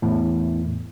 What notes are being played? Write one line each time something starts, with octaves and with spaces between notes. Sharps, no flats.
E2 A2